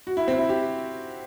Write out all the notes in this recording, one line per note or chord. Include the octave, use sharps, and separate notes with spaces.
F#4
E4
C4
E4
G4